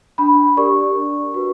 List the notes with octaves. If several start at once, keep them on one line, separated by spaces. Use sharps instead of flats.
D4 B5
G4 A#4 D5 C#6
D4
F#4 B4